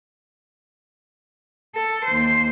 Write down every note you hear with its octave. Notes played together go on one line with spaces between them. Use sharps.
A4
D#2 C5